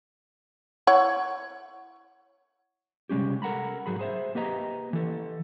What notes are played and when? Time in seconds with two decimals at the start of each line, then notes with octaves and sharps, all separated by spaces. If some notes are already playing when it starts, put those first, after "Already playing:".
0.87 E4 C#5 F#5
3.09 C3 G3 G#3 C#4 G4
3.42 A4 A#4 F#5 A#5 B5
3.86 G#2 F#3 G#4 B5
3.99 G#4 C5 E5
4.35 A#3 G4 B4 D#5 A#5
4.93 E3 A4